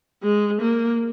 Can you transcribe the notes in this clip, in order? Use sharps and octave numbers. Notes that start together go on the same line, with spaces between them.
G#3
A#3